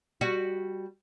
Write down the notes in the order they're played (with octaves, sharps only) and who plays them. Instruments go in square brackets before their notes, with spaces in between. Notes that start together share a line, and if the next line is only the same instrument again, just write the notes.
[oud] G3 F#4